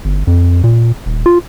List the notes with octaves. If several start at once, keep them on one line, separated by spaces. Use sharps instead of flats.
G1
F2
A#2
D#1
F4